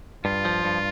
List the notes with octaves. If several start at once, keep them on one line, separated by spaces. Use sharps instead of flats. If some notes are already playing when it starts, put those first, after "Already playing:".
G2 F4
F3
G2